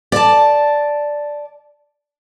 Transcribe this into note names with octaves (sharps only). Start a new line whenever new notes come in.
D5 A5